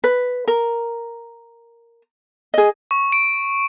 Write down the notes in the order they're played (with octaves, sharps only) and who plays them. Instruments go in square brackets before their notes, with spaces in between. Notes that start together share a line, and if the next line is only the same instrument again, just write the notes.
[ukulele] B4
A#4
G#4 D#5
[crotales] C#6
D7